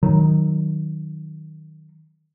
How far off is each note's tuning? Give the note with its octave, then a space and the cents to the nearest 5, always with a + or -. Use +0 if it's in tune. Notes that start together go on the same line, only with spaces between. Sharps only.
D#3 +0 F#3 +0